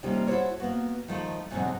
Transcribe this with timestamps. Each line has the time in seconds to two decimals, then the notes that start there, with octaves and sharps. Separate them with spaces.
0.03 C3 D#3 F3 G3 A#3 C#4
0.27 E4 F#4 G#4 A4 C5 C#5
0.60 A#3 B3 F#4
1.08 D#3 F3 A3
1.51 E2 G#2 B2 D3 F#3 C4